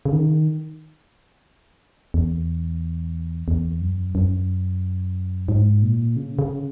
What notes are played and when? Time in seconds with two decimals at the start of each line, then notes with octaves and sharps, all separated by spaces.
0.06 C#3
0.12 D#3
2.14 E2
3.48 E2
3.81 F#2
4.15 F#2
5.48 G#2
5.82 A#2
6.16 C#3
6.39 C#3